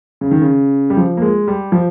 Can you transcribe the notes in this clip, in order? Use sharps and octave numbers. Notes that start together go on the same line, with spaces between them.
C#3
D#3
C#3
G3
F3
A#3
G#3
G3
F3